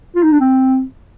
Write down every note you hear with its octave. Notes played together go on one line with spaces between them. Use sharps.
F4
D#4
D4
C4